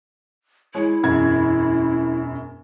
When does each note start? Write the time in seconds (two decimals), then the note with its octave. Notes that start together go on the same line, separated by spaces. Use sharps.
0.75 G#3 E4 C#5
1.03 E1 F#2 G#6